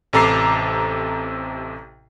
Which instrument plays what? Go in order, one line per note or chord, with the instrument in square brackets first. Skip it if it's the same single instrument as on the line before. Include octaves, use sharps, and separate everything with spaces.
[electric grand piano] A1 C3 A4 A#5 D6 C7